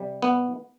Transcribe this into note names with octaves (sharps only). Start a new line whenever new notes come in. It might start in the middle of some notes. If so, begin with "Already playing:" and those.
Already playing: C3 G3
B3